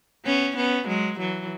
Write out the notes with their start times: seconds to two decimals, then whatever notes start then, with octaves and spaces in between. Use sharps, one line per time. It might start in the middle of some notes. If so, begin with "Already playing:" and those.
0.25 B3 C#4
0.57 B3 C#4
0.88 F#3 G#3
1.20 E3 F#3